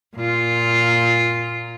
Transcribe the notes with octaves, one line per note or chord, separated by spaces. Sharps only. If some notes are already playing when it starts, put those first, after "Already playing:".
A#2 F4